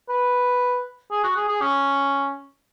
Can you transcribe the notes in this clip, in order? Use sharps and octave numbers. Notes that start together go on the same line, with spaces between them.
B4
G#4
F#4
G#4
G#4
C#4